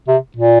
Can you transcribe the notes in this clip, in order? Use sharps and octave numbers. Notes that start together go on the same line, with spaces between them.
C3
A#2